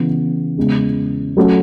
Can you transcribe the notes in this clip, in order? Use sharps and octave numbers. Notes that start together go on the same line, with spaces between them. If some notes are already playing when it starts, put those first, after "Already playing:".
Already playing: C#3 E3 B3
E2 C#3 G#3
F#3 A3 C#4 F#4 A4